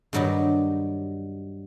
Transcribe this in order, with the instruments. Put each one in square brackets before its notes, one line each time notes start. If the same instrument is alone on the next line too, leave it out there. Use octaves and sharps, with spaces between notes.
[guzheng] G2 D#3 F#3 G3 D#4